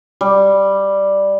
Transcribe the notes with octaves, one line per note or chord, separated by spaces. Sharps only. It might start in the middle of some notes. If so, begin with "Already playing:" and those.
G3